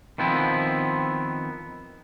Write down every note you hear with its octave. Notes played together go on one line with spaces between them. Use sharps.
D#3 F3 B3 C4 E4